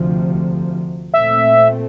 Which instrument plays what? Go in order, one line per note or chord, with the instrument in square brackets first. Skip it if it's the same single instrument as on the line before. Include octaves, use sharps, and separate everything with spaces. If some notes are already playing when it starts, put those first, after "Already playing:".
Already playing: [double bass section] D2 C3 F3
[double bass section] A#2 A3 C4 [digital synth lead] E5